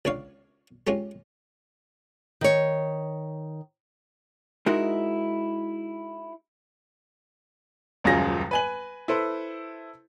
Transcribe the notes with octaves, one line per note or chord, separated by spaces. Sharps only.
C#2 D4 C#5 F5
G#3 C#4 F4 G4
D#3 C#5
G#3 D#4 E4 F#4 A#4
D#1 C#2 F#2 F4 G#4 A#6
B4 G#5 F#7
E4 A4 B4 C5